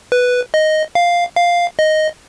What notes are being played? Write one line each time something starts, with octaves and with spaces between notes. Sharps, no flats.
B4
D#5
F5
F5
D#5